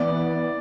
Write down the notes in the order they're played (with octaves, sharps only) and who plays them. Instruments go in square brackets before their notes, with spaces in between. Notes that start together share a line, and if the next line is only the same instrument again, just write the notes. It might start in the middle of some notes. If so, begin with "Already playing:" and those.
Already playing: [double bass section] E3 B3 [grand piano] D5